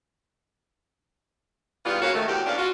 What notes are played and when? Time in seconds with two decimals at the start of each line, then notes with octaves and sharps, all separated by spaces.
1.85 G#2 E3 G3 B3 F4
2.01 C#3 A#3 C#4 F#4 C#5 F5
2.14 D#3 A3
2.26 E2 A2 F#4 G4
2.46 E2 A#2 C#4 D4 D5 F5
2.58 F4 F#4 F5